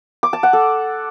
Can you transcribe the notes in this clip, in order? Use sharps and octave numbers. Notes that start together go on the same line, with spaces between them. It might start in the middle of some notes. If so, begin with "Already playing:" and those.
D6
A5
F#5
A4